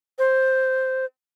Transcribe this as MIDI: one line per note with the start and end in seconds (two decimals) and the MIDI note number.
0.19 1.05 72